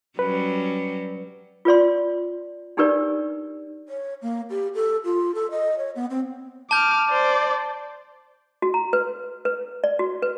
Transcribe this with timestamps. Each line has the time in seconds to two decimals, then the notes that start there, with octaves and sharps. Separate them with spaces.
0.19 F#3 G3 C#4 B4
1.65 F4 B4 D5 C6
2.77 D4 D#4 G4 A#4 B4 D5
3.89 C#5
4.22 A#3
4.50 G4
4.75 A4
5.04 F4
5.35 A4
5.51 D#5
5.78 C#5
5.96 B3
6.10 C4
6.71 A5 D6 F6 G6
7.09 C5 D5
8.62 F#4
8.74 A#5
8.93 B4
9.45 B4
9.84 D5
9.99 F#4
10.22 B4